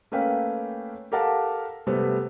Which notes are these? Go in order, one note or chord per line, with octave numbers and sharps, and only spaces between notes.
A3 A#3 C#4 B4 F5 G5
G4 A4 A#4 F5 F#5 A5
C3 G3 A3 B3 C4